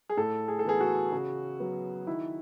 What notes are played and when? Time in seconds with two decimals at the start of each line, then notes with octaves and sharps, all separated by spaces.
0.09 G#4
0.17 A2 A4
0.48 G#4
0.59 A4
0.64 E3 B3 G#4
0.81 F#4
1.12 C#3
1.60 F#3 B3
2.07 D#3 E4